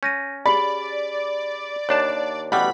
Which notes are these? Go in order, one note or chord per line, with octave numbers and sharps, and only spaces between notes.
C#4 G6 A#6 D#7
G4 G#4 D5 B5 F#7
D#2 D4 C#5 A5
A1 B2 G3 F#5 B5